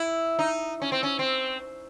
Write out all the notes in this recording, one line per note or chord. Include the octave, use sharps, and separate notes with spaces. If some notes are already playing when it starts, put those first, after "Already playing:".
Already playing: E4
D#4
C#4
C4
C#4
C4